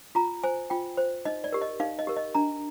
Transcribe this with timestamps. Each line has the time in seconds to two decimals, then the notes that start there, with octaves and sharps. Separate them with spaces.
0.15 F4 A#5
0.44 C5 G#5
0.70 F4 G5
0.97 C5
1.25 D#4 D#5
1.44 D5
1.52 G4 A#4
1.62 D#5
1.80 D#4 F5
1.99 D#5
2.07 G4 A#4
2.16 D#5
2.35 D4 A#5